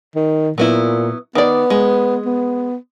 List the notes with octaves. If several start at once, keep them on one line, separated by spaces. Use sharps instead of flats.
D#3
A#2 F#3 B3 E4
D#3 B3 D5
G#3
B3